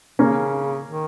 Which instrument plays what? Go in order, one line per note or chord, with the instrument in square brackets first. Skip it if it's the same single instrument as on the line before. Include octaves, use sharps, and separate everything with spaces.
[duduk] C#3 [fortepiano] A#3 C#4
[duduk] D#3